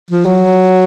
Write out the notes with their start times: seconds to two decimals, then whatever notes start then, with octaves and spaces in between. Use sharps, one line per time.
0.10 F3
0.25 F#3